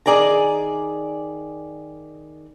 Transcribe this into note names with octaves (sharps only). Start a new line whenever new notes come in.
D#3 G#4 D5 G#5 A#5